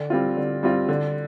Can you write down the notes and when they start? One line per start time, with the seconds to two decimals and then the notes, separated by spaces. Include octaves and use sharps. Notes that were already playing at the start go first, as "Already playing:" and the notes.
Already playing: D3
0.10 G3 C4 F4
0.37 D3
0.63 G3 C4 F4
0.88 D3